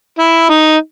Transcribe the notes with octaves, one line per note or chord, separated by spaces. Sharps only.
E4
D#4